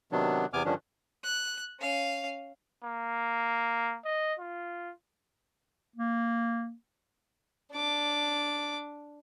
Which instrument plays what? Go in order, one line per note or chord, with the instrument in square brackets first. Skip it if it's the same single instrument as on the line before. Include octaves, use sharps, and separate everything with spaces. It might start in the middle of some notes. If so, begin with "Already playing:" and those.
[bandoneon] C3 D#3 F#3 B3 D4
E2 C3 B3 G#5 D6 F6
G2 D3 D#3 F3 C#4 D4
[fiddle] F#6
C#4 F5
[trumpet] A#3
D#5
F4
[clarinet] A#3
[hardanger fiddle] D4 D6